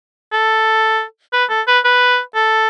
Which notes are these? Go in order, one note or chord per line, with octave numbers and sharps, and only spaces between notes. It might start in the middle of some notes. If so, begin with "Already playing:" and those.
A4
B4
A4
B4
B4
A4